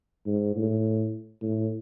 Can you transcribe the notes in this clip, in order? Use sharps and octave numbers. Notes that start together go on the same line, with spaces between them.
G#2
A2
A2